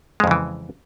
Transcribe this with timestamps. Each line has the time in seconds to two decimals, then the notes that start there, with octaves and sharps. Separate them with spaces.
0.20 G#3
0.24 F2
0.27 C#3
0.31 E3